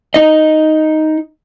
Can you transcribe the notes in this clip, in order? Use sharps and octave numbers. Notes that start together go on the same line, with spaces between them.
D#4 D#5